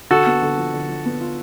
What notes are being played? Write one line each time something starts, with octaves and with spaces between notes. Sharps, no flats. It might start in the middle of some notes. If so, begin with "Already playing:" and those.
D3 F#4 A4
B3
D3
F3
D3
F3
B3
F4